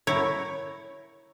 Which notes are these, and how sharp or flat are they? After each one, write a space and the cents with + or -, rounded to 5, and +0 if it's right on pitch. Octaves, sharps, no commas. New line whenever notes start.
E4 +0 A#4 +0 C#5 +0